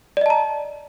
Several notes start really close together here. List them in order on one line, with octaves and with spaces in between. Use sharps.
D5 D#5 A5 A#5